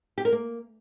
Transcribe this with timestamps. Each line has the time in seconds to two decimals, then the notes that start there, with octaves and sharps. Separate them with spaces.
0.18 G4
0.25 A#4
0.32 A#3